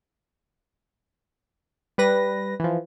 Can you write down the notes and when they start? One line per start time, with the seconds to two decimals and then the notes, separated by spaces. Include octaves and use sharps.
1.98 G3 B4 A#6
2.60 E3 F3